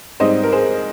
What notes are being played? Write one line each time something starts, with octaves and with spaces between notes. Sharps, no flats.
G#2 G3 C4 D#4 C5 D#5
A#4
G#4 C5